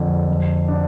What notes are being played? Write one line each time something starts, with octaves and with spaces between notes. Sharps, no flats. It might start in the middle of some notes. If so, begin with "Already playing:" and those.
Already playing: F2 D3
F2
D4